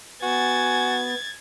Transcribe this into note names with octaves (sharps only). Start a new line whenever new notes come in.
B3 F#4 G#5 G#6 A6